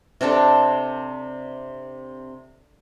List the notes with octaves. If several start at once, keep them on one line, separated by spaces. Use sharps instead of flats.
C3 C4 D4 A4